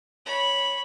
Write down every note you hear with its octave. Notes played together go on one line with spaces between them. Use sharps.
C#5 B5